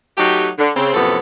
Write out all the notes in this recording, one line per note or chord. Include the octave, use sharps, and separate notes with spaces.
F#3 A3 D#4 F#4 G4
D3
C#3 C4
F#2 A2 C3 F3 B3 A4